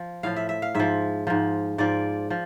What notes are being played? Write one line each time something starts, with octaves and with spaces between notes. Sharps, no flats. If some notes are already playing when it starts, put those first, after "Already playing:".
Already playing: F3
A2 F3 F5
E5
E5
F5
G#2 F3 E5
G#2 F3
G#2 F3 D5
F3